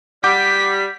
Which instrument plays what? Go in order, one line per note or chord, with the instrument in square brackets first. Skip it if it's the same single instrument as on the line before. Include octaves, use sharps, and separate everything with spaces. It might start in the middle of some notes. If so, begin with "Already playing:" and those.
[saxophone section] G3 [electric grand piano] F#5 D6 G6 [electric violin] B6